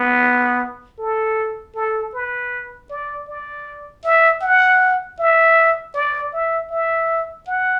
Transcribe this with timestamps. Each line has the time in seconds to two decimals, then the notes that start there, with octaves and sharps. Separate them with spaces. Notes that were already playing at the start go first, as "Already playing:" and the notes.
Already playing: B3
0.99 A4
1.75 A4
2.14 B4
2.90 D5
3.28 D5
4.04 E5
4.42 F#5
5.19 E5
5.94 D5
6.33 E5
6.71 E5
7.47 F#5